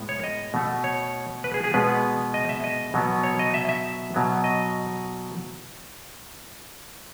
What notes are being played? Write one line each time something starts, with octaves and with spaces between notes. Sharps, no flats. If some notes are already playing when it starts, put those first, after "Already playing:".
Already playing: A2 G#3 B3
C#5
D#5
B2 A3
C#5
B4
G#4
G#4
B2 G#3 B3 B4
D#5
E5
D#5
B2 F#3 B3
C#5
D#5
E5
E5
B2 F#3 B3
D#5